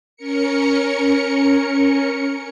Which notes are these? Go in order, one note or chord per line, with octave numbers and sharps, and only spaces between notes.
C#4 A#4 C#7